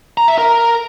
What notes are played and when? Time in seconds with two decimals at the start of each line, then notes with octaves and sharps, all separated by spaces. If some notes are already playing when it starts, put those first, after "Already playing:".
0.18 A#5
0.28 E5
0.38 A#4